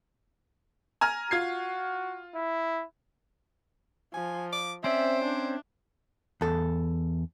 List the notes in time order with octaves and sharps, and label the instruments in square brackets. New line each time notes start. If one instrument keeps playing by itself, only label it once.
[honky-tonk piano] G#5 A#5 F6
[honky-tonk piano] F4 G#6 C7 [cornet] F#4
[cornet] E4
[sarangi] F3 [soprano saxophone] G#5
[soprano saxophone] D6
[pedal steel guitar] C4 C#4 D5 [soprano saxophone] C5 [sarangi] E5
[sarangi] D4
[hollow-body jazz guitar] E2 A4